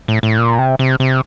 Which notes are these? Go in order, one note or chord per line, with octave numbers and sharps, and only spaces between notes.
A2
A2
A#2
C3
C3
C3